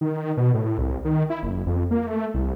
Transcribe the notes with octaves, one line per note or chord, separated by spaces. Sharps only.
D#3
B2
A2
C2
D#3
E4
F#1
F2
A#3
A3
C2